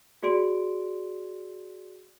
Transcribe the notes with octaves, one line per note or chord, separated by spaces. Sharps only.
F#4 G#4 D5 C6 D7